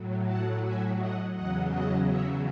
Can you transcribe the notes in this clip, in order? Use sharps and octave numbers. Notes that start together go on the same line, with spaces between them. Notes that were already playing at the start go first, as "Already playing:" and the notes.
Already playing: A2 F#3
F#5 A5
E5 G#5
D#5 F#5
E2 C#3 F#3 D#5 F#5
D#5 F#5
C#5 E5